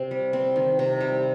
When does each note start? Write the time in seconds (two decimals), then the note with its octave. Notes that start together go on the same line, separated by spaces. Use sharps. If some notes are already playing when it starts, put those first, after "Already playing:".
Already playing: C3 C4
0.11 G3
0.33 C4
0.56 D#3
0.79 C3
1.01 G3